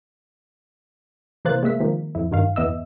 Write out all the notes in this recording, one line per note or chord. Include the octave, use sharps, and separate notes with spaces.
C3 E3 A#3 C5 F#6 A6
G#3 A#3 E5 B6
D#3 F3 G#3 A#3
F2 E4
G2 D#3 F5
E2 B3 D#5 E5 E6